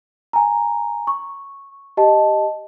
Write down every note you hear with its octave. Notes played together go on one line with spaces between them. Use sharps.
G#5 A#5
C#6
G4 D#5 A5